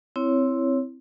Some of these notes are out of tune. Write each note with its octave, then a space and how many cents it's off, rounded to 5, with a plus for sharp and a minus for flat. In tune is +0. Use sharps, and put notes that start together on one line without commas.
C4 +0 E4 +0 C#5 +0